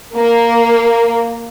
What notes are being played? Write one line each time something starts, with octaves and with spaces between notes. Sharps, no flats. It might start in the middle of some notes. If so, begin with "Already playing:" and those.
A#3